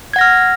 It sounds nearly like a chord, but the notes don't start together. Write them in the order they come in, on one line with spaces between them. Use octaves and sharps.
G#6 F#5 A#6 F6